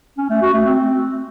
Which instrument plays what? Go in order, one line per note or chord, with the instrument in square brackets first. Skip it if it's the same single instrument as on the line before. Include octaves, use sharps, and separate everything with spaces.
[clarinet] C#4
A3
F#4
A3
C4